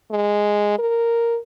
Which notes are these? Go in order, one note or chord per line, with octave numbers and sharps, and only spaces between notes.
G#3
A#4